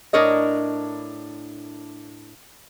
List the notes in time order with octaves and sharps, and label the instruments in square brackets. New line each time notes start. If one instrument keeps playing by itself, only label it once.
[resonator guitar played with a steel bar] A2 D4 A#4 C#5 D#5